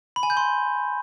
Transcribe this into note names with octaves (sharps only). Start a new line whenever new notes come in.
B5
G#5
G6
C6